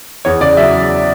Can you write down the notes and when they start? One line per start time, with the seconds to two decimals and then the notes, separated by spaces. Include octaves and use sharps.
0.25 E2 C#5
0.41 C#3 D5
0.57 F#3 E5